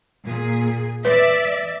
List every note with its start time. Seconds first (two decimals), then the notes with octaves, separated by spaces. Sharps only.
0.23 A#2 G#4
1.05 B4 D5 E5